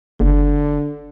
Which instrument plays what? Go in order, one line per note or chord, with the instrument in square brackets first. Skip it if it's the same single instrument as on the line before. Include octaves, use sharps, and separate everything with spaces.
[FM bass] F#1 [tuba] D3